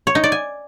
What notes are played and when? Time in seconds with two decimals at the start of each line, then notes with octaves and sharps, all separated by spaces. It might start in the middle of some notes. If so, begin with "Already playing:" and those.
0.07 C#5
0.15 D#4
0.24 D5
0.32 G#5